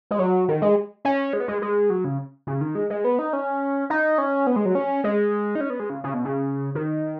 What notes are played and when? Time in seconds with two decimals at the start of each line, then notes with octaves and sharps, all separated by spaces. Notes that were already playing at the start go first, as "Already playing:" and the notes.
0.11 G#3
0.19 F#3
0.48 D#3
0.62 G#3
1.05 C#4
1.33 G#3
1.40 B3
1.48 G#3
1.62 G#3
1.90 F#3
2.04 C#3
2.47 C#3
2.61 D#3
2.75 G#3
2.90 G#3
3.05 B3
3.19 D#4
3.33 C#4
3.90 D#4
4.18 C#4
4.47 B3
4.56 G#3
4.66 F#3
4.75 C#4
5.04 G#3
5.55 D#4
5.61 C#4
5.70 B3
5.80 G#3
5.90 C#3
6.04 C#3
6.14 B2
6.25 C#3
6.75 D#3